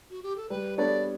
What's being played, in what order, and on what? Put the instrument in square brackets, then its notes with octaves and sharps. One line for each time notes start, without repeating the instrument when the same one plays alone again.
[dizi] F#4
G4
A4
[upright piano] G3 [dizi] B4
[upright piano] B3 D4 A4 C#5 [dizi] D5